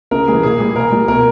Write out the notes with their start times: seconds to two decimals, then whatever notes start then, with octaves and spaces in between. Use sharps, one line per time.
0.11 C#3 A#4
0.28 E3 G3 G#4
0.43 A#2 G#4
0.60 G3
0.76 A#2 A#4
0.92 G3
1.08 B2 A#4